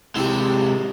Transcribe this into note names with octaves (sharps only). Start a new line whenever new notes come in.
C3 G#3 E4 G4